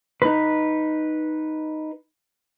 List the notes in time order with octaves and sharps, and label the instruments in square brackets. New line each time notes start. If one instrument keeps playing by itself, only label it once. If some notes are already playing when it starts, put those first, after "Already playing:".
[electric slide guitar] D#4 B4